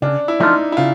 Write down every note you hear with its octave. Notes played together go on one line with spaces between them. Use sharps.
C#3 D4
E4
F3 A3 D4 D#4 F4
E4
C#3 F4